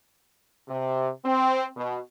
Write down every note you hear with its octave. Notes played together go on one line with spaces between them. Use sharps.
C3
C4
B2